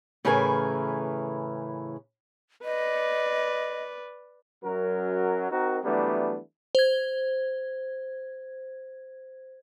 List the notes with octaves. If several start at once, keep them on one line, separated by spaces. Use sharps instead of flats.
A2 C#3 E3 A#4 B4 G#5
B4 D5 D#5
F#2 F#3 A#4
C4 D#4 F#4 A#4
E3 F#3 G3 A3 B3 D4
C5 G#6